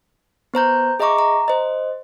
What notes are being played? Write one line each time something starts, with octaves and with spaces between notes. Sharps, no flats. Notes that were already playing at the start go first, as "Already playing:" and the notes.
B3 C5 A#5 G6
G#4 D#5 E5 A#5 C#6 D6
A#5
C5 D#5